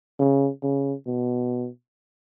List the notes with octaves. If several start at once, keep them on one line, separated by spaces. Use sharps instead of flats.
C#3
C#3
B2